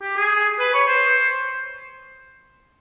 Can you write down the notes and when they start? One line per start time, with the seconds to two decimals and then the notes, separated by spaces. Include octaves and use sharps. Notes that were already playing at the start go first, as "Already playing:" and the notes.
0.02 G4
0.17 G#4
0.59 B4
0.74 C#5
0.88 C5